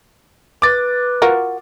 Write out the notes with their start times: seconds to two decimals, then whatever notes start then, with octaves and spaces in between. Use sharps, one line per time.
0.62 B4 D6 A6
1.22 F4 F#4 A#4